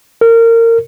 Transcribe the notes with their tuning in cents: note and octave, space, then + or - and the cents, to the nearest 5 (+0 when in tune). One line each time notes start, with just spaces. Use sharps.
A#4 -25